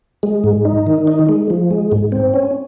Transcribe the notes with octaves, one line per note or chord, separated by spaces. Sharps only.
G#3
G#2
D#4
D#3
D#4
G#3
F3
G#3
G#2
C4
C#4